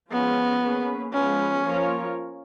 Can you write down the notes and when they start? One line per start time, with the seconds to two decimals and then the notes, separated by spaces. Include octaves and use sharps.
0.11 F3 G#3 B3 C#4 F4 G#4
0.62 A#3 C#4 G#4 B4
1.13 F3 G#3 B3 C#4 F4 B4
1.64 F3 A#3 F4 A#4 C#5